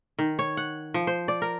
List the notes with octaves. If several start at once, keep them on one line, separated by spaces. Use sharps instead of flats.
D#3
C#5
F#5
F3
C5
D5
A#4